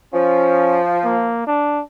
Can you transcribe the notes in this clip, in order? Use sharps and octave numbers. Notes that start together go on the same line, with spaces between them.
F3 C#4
A#3
D4